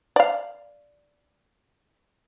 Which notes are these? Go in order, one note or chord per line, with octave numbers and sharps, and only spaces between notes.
D5 F5